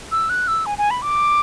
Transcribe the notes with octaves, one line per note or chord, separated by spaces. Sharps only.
E6
F#6
E6
G#5
G#5
B5
D6